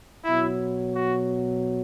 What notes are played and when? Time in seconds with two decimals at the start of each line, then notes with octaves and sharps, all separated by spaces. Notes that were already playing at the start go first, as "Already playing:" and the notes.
0.25 B2 F#3 E4
0.96 F#4